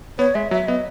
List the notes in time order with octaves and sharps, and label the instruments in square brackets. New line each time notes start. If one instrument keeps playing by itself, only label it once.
[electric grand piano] B3 [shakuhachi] C#5
[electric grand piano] G#3 [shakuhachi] E5
[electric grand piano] F#3 [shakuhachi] E5
[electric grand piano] B3 [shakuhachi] D#5